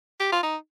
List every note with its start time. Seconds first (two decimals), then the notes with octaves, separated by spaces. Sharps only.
0.20 G4
0.32 F4
0.43 D#4